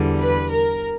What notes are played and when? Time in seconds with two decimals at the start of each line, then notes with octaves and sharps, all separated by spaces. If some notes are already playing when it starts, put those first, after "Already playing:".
Already playing: E2 D3 G3
0.19 B4
0.52 A#4